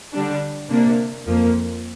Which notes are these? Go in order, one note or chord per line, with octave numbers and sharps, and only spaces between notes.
D3 G3 D4
C3 A#3 D4
F2 F3 A#3